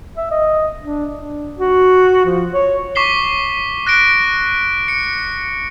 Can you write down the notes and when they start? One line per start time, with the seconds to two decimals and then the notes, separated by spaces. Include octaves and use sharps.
0.17 E5
0.31 D#5
0.82 D4
1.14 D4
1.58 F#4
2.25 F3
2.53 C#5
2.95 C#6 D6 B6 C7 G7
3.87 F#6 A#6 B6 D7
4.88 C#7